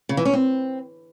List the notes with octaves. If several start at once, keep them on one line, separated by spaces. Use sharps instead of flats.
C#3
E3
C#4
C4